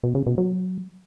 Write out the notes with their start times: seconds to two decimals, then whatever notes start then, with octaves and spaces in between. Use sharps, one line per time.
0.03 B2
0.15 C#3
0.26 B2
0.38 F#3